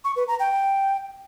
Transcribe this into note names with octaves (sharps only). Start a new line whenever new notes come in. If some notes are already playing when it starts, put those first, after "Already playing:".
C#6
B4
A#5
G5